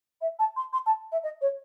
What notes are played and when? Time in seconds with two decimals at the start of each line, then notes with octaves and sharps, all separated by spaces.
0.21 E5
0.39 A5
0.56 C6
0.73 C6
0.86 A5
1.12 E5
1.23 D#5
1.41 C#5